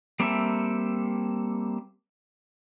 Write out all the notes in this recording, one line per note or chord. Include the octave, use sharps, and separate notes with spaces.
G3 A#3 C4 A4 E5